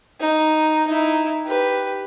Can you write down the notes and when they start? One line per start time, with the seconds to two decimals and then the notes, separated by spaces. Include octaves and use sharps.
0.20 D#4
0.87 D#4 E4
1.46 G4 B4